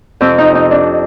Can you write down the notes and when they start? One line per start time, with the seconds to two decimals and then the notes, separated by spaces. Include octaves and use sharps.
0.21 F2 C3 F3 C4
0.38 D#4
0.55 D#4
0.71 D4